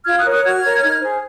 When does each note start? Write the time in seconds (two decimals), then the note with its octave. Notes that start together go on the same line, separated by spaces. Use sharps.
0.06 F4 F6 G#6
0.19 D#6 F#6
0.24 A#4 C#5
0.31 D#6 F#6
0.44 F#4 F6 G#6
0.63 A#4 C#5
0.83 D#4
1.01 G#4 C5